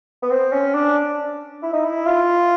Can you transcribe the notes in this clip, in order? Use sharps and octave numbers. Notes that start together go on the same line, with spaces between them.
B3
C4
C#4
D4
E4
D#4
E4
F4